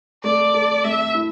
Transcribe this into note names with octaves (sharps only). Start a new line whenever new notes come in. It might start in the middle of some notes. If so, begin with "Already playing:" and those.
A3 D5
A4
A3 E5
E4